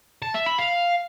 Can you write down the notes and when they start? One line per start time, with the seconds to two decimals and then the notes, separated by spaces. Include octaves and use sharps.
0.23 A5
0.34 E5
0.46 B5
0.58 F5